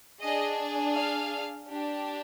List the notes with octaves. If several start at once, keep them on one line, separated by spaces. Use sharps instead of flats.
D4 G#4 D#5
F5
D4 G4